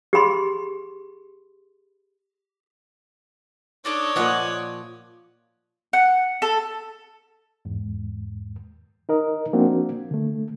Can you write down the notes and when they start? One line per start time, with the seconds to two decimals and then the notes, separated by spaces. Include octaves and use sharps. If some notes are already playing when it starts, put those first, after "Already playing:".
0.13 G4 G#4 B5 C6
3.85 D4 D#4 A4 C#5 D5 D6
4.16 A#2 F3 D#5 F#5 G#5
5.93 F#5
6.42 A4
7.65 E2 G#2
9.09 D#4 A#4 D#5
9.53 F3 A#3 C4 D4 F#4
10.11 D3 A3